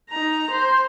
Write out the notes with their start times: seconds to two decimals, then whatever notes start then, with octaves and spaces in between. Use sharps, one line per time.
0.10 D#4 A#5
0.51 C5